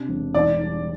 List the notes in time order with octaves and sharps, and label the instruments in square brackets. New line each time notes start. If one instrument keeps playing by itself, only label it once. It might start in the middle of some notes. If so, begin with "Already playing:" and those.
Already playing: [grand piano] C3 D4
E1
[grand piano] E1 [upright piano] D5
[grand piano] G3